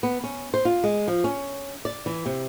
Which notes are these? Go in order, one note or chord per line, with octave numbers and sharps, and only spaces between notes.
B3
C#4
C5
F4
G#3
F3
C#4
D5
E3
C3